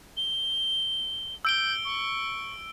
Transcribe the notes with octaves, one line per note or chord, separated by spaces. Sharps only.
G7
E6 G6 D7 G7
C#6